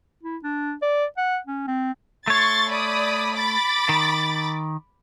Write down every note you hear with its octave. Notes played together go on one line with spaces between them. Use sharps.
E4
D4
D5
F#5
C#4
C4
A3 C#5 C6 C#6 A6
D5 B5 D#6
B5 D6 A6
D#3